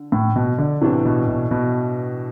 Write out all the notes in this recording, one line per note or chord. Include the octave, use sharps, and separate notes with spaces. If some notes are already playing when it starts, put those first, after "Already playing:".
Already playing: D3
A2
B2
D3
A2 C3 E3 B3 D4
B2
B2
B2